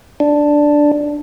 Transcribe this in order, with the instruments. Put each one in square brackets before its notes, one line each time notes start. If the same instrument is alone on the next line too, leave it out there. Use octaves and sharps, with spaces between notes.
[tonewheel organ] D4